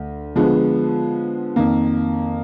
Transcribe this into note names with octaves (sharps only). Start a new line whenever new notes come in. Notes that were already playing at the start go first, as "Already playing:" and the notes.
Already playing: D2
D3 F3 G#3 B3
F2 D#3 A#3